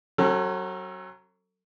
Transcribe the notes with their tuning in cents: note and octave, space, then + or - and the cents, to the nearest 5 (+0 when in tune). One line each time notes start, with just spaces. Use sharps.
F#3 +20 C#4 -40 A4 +30